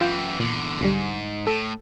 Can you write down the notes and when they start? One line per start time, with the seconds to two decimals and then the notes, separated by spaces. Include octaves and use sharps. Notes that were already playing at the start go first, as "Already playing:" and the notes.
0.01 F#2 E3 F4 G5
0.39 E2 A#2 D3
0.81 B1 G#2 D3 G3
1.47 A2 A4